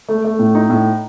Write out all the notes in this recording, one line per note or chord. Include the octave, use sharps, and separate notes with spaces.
A3
A3
A2
D#4
A2